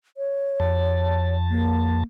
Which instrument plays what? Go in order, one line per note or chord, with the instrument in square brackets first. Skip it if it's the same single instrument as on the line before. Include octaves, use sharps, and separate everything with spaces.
[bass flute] C#5
[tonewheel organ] F2 A5
[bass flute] A#3